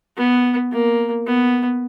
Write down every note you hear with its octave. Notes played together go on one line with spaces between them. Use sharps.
B3
A#3
B3